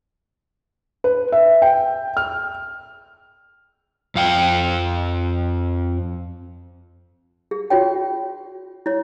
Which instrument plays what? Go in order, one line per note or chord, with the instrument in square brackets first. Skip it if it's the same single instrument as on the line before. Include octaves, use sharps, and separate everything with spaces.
[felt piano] B4
E5
G5
F6
[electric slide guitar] F2 F5 G5
[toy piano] G#4
F4 F#4 C#5 G5
E4 C#5